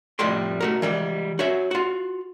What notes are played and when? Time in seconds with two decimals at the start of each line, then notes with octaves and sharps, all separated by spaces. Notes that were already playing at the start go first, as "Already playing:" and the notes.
0.19 F2 A2 G3 G5 C6
0.60 A3 F#4 A#4
0.82 E3 G3 G#3
1.39 F#4 C#5 E5
1.71 F4 F#4